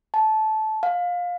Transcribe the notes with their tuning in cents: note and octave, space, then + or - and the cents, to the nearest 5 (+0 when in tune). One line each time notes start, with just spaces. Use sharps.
A5 -15
F5 +20